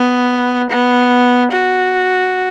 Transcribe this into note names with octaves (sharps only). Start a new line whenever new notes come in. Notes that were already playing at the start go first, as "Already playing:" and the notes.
Already playing: B3
B3
F#4